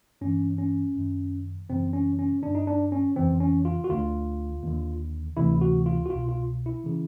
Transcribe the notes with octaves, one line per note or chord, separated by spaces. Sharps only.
G2 E3 C#4
C#4
F#2 D#3
F#2 C#3 E3 C4
C#4
C#4
G2 D3 D4
D#4
D4
C#4
F2 C#3 E3 C4
C#4
F4
F#4
D2 D3 F4
D#2 D3
D2 C3 E3 E4
F#4
F4
F#4
C2 B2 F4
F4
E4
C#3 E3